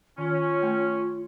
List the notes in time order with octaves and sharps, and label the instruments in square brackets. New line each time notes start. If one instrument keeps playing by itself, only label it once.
[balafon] D#3 [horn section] C#4 [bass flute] F4
[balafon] A3